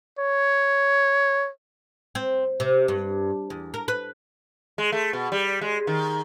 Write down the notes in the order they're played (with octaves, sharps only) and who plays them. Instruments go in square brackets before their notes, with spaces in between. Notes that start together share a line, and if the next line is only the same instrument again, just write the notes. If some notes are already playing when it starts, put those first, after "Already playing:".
[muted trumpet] C#5
[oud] C4
C3
G2
E2
A#4
B4
[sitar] G#3
A3
B2
G3
G#3
D#3